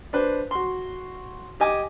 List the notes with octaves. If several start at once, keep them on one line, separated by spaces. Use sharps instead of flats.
D4 B4 C5
F#4 C6
G4 D#5 G#5 D6